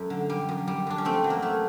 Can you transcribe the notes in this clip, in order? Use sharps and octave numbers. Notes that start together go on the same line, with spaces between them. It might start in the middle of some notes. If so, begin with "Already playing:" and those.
Already playing: F#2 A3 C#4
D3
G3
F#2
G3
F#2 D4
C#4
A3 C4
F#3
A#3
A3